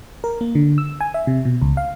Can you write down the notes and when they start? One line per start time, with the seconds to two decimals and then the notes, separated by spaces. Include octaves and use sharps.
0.24 A#4
0.41 A#3
0.55 D3
0.78 E6
1.01 G#5
1.14 E5
1.27 C3
1.45 B2
1.61 C#2
1.77 F5